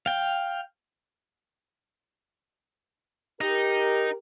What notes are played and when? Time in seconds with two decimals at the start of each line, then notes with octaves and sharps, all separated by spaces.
0.06 F5 G5
3.41 D#4 G4 A#4